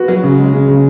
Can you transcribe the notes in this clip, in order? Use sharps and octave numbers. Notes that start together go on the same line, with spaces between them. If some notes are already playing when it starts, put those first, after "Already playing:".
Already playing: F#4 B4
F#3
C#3
G#3
C#3
C#3